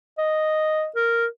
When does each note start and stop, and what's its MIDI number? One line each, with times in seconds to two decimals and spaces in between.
0.18 0.87 75
0.96 1.26 70